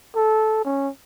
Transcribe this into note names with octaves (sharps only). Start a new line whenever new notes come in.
A4
C#4